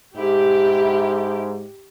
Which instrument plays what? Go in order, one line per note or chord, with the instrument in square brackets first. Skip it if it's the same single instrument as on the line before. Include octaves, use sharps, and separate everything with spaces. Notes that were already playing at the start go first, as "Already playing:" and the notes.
[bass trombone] G#2 [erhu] E4 [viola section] G4